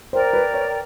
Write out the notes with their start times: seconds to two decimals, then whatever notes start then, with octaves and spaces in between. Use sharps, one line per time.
0.13 A#4 C5 D5 G5 A#5
0.33 B4
0.54 C#5